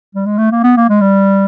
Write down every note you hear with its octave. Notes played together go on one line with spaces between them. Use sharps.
G3
G#3
A3
A#3
B3
A#3
G#3
G3